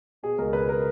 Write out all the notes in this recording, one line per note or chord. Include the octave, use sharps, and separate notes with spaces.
B2 G#4
C#2 A#4
C#2 B4
A#4